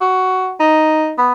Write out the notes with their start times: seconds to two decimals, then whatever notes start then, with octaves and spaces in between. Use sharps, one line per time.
0.01 F#4
0.60 D#4
1.18 B3